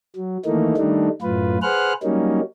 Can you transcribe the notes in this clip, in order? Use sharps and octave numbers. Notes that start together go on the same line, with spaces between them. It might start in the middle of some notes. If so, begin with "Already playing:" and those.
F#3
D#3 E3 A3 A#3 D#4
D#3 G3 A3 D4 D#4
F#2 A2 F4 B4
G#4 B4 C5 F#5 F6 F#6
F#3 G3 A#3 C#4 D#4